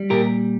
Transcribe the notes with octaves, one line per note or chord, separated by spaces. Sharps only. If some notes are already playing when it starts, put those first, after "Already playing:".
Already playing: G3
A#2 G4 A#4